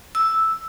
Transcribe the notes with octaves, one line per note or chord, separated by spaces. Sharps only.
E6